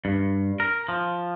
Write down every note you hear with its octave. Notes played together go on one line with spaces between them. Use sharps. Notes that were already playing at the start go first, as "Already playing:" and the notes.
G2
A#4
F3